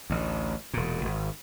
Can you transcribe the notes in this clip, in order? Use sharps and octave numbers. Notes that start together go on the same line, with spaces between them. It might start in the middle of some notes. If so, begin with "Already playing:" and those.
A1 D2
E1 A#2
G#1